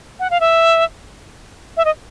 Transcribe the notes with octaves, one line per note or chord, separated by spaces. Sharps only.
F#5
F5
E5
E5
D#5